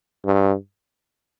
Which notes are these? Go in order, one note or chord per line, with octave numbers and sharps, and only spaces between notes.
G2